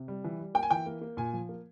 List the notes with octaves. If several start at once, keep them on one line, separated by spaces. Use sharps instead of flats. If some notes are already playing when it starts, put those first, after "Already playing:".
Already playing: C3
G3
E3
G3
A#3 G5
G#5
E3 G5
A#3
A#3
A#2 G#5
F3
A#3